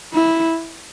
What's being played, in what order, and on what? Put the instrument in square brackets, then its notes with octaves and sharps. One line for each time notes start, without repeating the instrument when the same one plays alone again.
[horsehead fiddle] E4